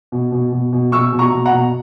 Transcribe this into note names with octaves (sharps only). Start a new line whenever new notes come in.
B2
B2
B2
B2
B2 C#6 E6
B2
A#5 C#6
B2
F#5 A#5
B2